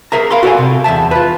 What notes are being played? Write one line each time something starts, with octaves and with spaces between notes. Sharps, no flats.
G#4 A#4 E5 A#5
A#4 F5 B5 C6
F#4 A4 D5 G#5
C3
E2 G#2 E5 A5
F4 B4